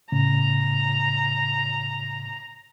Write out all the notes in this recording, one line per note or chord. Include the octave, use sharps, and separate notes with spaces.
A2 C#3 A#5